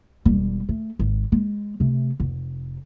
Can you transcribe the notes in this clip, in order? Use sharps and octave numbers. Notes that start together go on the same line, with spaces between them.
E1 G3
A3
G#1
G#3
C3 A3
F1